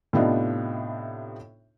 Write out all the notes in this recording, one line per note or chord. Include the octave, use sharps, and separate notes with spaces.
A2 C3 B3 D4 D#4 F4